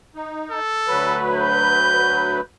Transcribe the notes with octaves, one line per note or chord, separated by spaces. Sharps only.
D#4
A4
D2 F#3 B4
G6